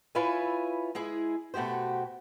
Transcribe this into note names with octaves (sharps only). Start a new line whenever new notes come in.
E4 F4 B4 C#5 E5 G#5
G#3 E4 G#4
B2 A3 F#4 G4 C5